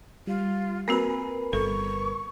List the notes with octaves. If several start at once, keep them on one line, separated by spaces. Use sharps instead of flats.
G3 F4
A#3 C4 F#4 A#4 B4 G#5
G1 A4 C#6